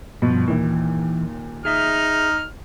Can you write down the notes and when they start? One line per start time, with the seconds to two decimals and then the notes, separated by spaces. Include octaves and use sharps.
0.22 G2 B2 F3
0.48 D#2 A#2 E3
1.65 D#4 G#4 E5 F6